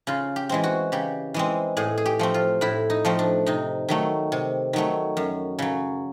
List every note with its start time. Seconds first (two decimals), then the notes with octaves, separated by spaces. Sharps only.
0.07 C#3 F4
0.36 G4
0.49 E3 G#3 C4
0.64 F#4
0.92 C#3 G4
1.34 E3 G#3 C4
1.77 A2 G#4
1.98 G#4
2.06 G4
2.19 F3 A3 C4
2.34 F4
2.61 A2 E4
2.90 D#4
3.05 F3 A3 C4
3.19 D4
3.46 C3 D#4
3.89 D#3 F#3 A3
4.32 C3
4.73 D#3 F#3 A3
5.17 F#2
5.59 C#3 F#3